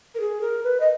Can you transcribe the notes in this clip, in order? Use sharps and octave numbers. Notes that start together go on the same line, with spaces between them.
A#4
G#4
A#4
B4
D#5